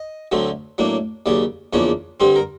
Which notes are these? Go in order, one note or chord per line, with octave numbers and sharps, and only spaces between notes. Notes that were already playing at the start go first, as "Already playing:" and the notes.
Already playing: D#5
D2 D3 F#3 A3 C4
A2 F#3 A#3 D4
D#2 C#3 F#3 D5
E2 C#3 F3 A#3 D4 C#5
G2 D3 G3 C4 C5
A#4